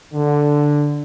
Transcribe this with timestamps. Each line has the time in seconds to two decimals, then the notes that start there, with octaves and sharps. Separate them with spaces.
0.14 D3